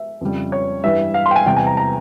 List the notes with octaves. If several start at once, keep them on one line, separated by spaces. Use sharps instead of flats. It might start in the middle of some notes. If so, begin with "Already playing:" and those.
Already playing: E5
F2 C#3 G3
C#5
G2 E3 G3 E5
F5
C6
G5
G#5
E2 C3 E3 G3 G5
G#5
A#5
A#5